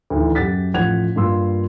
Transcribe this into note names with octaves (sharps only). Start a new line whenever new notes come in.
D2 D#3 E3
F#2 G4 F#5 A6 B6
A1 F3 F#5 G#6 F7
G2 A#3 F4 C6 E6